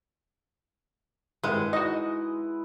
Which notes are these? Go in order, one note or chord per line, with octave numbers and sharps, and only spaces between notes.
G#1 G2 G#3 E4 B4 F#5
D#4 F#4 D#5